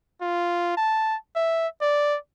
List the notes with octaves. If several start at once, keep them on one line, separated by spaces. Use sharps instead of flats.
F4
A5
E5
D5